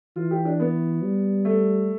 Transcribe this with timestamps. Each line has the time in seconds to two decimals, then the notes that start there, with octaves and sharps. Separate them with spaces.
0.16 E3 F4
0.31 G4
0.45 D4
0.60 B3
1.02 G3
1.45 A3